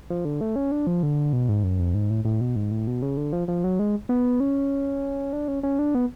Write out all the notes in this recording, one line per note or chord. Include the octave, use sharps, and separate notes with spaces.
F3
D3
A3
C#4
D4
F3
D3
B2
G#2
F#2
F2
G#2
A2
A2
B2
G#2
A2
B2
C#3
D3
F3
F3
F#3
G#3
B3
C#4
D4
C#4
C#4
D4
B3